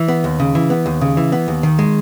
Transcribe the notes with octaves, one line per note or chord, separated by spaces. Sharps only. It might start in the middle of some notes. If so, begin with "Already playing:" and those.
Already playing: E3
B3
D#2
C#3
E3
B3
D#2
C#3
E3
B3
D#2
D#3
G#3